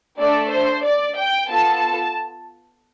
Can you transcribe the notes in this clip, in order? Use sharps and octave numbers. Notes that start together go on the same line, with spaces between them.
A3 D4 A4 D5
C5
D5
G5
B3 F4 A4 A5